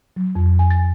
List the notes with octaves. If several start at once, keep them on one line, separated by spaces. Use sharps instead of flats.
F#3
F2
G#5
A6